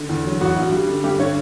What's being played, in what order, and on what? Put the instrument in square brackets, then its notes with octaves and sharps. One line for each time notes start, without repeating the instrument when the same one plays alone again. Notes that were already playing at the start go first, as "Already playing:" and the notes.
Already playing: [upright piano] D3
E2
F#3
A1 F#4
G2
G3
D3
G2 G4
D3 C#5